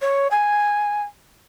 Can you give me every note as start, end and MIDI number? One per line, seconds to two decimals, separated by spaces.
0.01 0.27 73
0.30 1.01 80